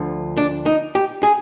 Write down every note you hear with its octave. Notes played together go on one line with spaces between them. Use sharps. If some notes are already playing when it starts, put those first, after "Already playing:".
Already playing: D2 D3 F3
D4
D#4
G4
G#4